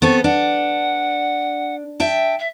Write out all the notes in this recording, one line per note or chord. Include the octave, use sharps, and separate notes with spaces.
B3 C4 A4 C#6
D4 F#5
E5 G5 A5
E5